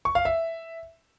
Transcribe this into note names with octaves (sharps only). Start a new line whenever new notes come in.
C#6
F5
E5